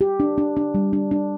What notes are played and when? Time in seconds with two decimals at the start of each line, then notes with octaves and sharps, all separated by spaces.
0.01 G4
0.20 D4
0.38 D4
0.57 D4
0.74 G3
0.93 D4
1.11 D4